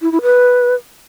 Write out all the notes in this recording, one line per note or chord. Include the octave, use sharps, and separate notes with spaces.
E4
E4
B4